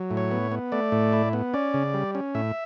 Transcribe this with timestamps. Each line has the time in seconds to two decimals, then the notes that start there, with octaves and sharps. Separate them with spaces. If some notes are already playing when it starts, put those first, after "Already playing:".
Already playing: F#3
0.11 A2
0.17 C#5
0.31 B3
0.52 B3
0.72 A3 D5
0.92 A2
1.13 E4
1.33 B3
1.54 C#4 D5
1.74 C#3
1.94 G3
2.15 C#4
2.34 A2 E5